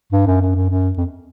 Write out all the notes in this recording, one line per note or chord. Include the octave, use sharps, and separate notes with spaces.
G2
F#2
F#2
F#2
F#2
F2